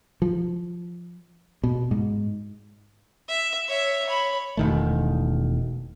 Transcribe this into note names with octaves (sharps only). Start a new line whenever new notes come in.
F3
B2
G#2
E5
C#5 E5
C#5 B5
E1 D#3 A3